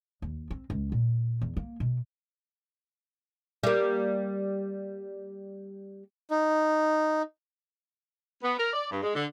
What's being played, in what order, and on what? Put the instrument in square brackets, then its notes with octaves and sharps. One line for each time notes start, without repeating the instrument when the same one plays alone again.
[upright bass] D#2
C4
C#2
A#2
E2
A#3
B2
[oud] G3 A#3
[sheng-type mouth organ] D#4
[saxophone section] B3
A#4
D5
G2
G#3
D3